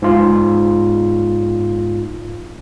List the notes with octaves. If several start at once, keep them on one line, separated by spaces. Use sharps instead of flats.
G#2 F4